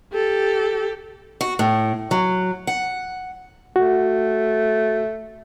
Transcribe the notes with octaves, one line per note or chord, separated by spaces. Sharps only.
G4 A4
F#4
A2
F#3
F#5
A3 F#4